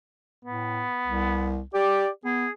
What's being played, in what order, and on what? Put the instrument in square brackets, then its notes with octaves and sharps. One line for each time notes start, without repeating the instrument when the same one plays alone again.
[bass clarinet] A2 [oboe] B3
[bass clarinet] C2
[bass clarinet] G4 [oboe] D5
[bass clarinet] B3 [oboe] G#4